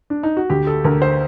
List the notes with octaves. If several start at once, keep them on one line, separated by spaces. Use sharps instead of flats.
D4
D#4
F#4
D2 G4
A4
D2 A#4
C5